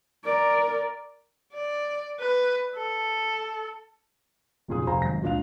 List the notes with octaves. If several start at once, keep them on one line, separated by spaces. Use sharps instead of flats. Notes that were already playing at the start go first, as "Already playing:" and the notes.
A#4 D5
D5
B4
A4
F1 B1 A#2 C#3 G#4 D#6
F1 C5 F5 G#5 A#5
G#1 F#2 A#6
C#2 A#2 D4 F5 F7